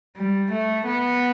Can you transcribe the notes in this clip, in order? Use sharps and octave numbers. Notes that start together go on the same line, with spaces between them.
G3
A3
B3